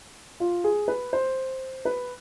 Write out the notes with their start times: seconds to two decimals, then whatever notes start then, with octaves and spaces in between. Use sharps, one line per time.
0.40 F4
0.64 G#4
0.88 B4
1.13 C5
1.85 B4